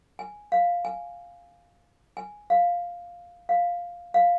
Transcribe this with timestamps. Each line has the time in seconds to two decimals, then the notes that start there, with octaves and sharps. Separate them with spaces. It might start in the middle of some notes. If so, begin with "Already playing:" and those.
0.19 G#5
0.52 F5
0.85 G#5
2.17 G#5
2.50 F5
3.49 F5
4.14 F5